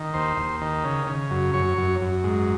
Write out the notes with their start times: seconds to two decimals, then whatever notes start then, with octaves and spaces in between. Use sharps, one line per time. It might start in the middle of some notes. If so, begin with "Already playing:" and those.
Already playing: D#3
0.14 D#2 C5
0.37 D#2
0.61 D#3
0.84 C#3
1.07 C#3
1.31 F#2
1.53 F#2 C#5
1.78 F#2
2.01 F#2
2.24 G#2